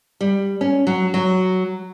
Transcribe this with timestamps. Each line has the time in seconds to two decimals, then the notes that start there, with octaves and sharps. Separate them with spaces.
0.21 G3
0.61 C#4
0.87 F#3
1.14 F#3